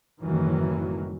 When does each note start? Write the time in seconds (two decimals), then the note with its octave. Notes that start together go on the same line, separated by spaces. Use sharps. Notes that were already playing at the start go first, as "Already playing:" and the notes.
0.22 F#1 A2 D#3 E3 F#3 G3